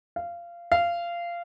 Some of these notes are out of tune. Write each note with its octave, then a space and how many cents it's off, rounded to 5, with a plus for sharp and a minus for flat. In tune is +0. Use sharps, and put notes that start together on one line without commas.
F5 -20
F5 -20